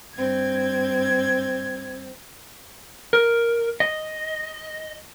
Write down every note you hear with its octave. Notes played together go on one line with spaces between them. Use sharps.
G2 C4 G#6
A#4
D#5